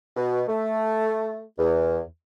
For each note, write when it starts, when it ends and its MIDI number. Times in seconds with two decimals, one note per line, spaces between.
0.16 0.42 47
0.48 1.40 57
1.59 2.00 40